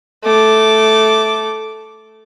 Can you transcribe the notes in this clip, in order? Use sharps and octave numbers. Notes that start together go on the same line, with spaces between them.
A3 D6